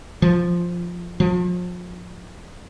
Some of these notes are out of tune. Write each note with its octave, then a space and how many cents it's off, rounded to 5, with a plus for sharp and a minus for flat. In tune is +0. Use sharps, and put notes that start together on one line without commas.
F3 +0
F3 +35